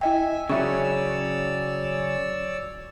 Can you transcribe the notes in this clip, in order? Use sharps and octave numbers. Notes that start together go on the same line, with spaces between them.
E4 D#5 E5 G5 G#5
C#3 F#3 C#4 C#5 D5 E5 C#6 E6